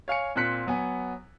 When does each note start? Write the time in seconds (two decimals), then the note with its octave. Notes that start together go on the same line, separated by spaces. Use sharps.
0.08 C#5 F5 G#5 C#7
0.36 A#2 C4 F#6 B6 C#7
0.66 F#3 B3 G#5